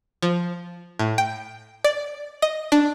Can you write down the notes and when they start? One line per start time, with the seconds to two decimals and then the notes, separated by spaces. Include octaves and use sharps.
0.22 F3
0.99 A2
1.18 G5
1.84 D5
2.42 D#5
2.72 D4